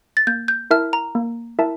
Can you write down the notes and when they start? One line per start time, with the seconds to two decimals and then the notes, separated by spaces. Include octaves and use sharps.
0.17 A6
0.27 A#3 G6
0.48 G6
0.71 E4 A#4 E5 A5 F6
0.93 A#5
1.15 A#3
1.59 E4 A#4 E5 A5